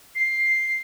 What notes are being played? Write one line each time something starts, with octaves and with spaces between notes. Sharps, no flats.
C7